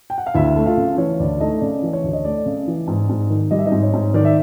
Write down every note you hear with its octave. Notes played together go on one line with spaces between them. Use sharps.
G5
F#5
F5
D2 E4 E5
A3
F4 F5
C#3
E3 C#5
D2 D5
A3 D#4 D#5
C#3 D5
E3
C#5
D2
D#5
A3 D5
C#3
E3
G#2
G#2
D#3
G3 D#5
E5
D#4 D#5
G#2
C#5
G#2
D#3 D5
E5